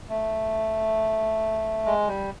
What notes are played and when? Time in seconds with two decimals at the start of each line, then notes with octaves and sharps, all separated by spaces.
0.09 A3
1.86 G#3
2.07 G3